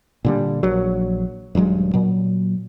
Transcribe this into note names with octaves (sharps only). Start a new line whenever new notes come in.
A#2 D3 G3
A#1 F#3
D#1 G2 F#3 G#3
A#2 F#3